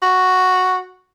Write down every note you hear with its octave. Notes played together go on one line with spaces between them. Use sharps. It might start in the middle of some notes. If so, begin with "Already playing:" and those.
F#4